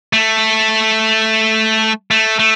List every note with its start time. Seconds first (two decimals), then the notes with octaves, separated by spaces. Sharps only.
0.13 A3
2.11 A3
2.39 A3